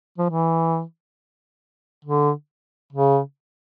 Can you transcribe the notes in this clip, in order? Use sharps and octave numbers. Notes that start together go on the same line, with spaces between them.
F3
E3
D3
C#3